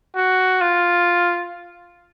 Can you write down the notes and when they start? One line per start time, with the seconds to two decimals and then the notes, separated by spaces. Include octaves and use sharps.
0.16 F#4
0.61 F4